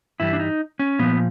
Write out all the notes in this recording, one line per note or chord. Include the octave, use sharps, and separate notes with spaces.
G2 E3 G3 E4
D4
D#4
C#4
A#2 F3 B3